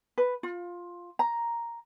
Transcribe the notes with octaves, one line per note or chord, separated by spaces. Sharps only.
B4
F4
A#5